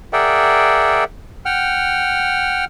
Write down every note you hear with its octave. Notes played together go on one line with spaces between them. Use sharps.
G#4 A#4 D5 E5 F#5 G5
F#5 G5 F6